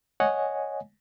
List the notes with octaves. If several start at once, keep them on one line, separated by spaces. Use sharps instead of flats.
C#5 D#5 F#5 G#5